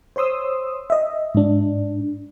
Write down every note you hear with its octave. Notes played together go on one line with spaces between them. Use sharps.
C5 C#5 C6 D#6 E6
D#5 E5
G#2 D4